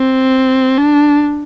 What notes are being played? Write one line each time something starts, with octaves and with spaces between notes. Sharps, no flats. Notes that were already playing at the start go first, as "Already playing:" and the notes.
Already playing: C4
D4